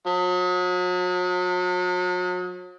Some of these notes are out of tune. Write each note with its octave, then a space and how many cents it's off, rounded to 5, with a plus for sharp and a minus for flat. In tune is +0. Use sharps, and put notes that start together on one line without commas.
F#3 -40